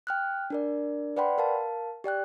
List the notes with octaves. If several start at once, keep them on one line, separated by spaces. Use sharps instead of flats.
G5 F6 F#6
D4 A#4 D5
B4 D5 F#5 G5 B5 C6
A#4 F5 A5
G4 D5 G5 F#6